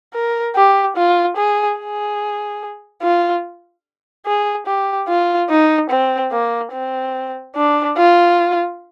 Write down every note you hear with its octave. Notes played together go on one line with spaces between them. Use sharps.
A#4
G4
F4
G#4
G#4
F4
G#4
G4
F4
D#4
C4
A#3
C4
D4
F4